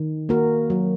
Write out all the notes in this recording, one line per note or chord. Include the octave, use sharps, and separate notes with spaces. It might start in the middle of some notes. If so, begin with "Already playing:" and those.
Already playing: D#3
A#3 F#4 A#4
F#3